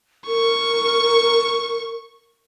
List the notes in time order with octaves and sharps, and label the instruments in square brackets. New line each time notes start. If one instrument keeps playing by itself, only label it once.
[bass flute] A#4 [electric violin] C#6